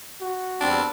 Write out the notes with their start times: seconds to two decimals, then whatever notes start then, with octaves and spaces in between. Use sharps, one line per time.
0.21 F#4
0.61 E2 G3 C4 D4